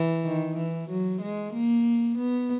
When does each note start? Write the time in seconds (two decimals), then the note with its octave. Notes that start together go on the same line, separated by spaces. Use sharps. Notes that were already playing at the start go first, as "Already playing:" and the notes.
Already playing: E3
0.25 D#3
0.57 E3
0.90 F#3
1.22 G#3
1.53 A#3
2.18 B3